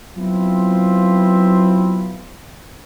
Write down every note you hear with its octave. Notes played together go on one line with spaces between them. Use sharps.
F#3 B3 C4 E4 F4